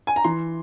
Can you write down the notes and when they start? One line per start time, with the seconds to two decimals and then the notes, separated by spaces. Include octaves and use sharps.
0.07 G#5
0.16 A#5
0.24 E3 C6